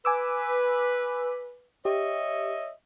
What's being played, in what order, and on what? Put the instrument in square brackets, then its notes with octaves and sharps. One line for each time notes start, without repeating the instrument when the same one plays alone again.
[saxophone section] B4 [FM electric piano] G#5 D6 E6
[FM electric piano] G4 [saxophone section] C#5 D#5 E5